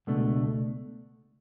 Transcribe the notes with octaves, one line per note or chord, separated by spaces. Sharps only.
C#2 B2 A3 D4